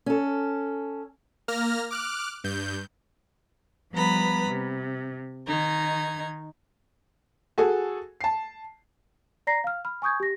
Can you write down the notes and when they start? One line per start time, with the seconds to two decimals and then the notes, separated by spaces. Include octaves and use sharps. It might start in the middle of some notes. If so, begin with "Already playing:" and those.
0.06 C#4 A4
1.48 A#3 F6 A#6
1.91 D6 F6 F#6
2.44 G2 G6
3.93 F3 G3 B3 B4 A#5 B5
4.48 C3
5.48 D#3 D#4 G#6
7.58 F#4 G#4 A4 G#5
8.21 A5 C7
9.47 D5 A#5 A#6 C7
9.64 F5 F6
9.85 B5 F6
10.02 G#5 C#6 D#6 G6 G#6
10.20 G4 A#6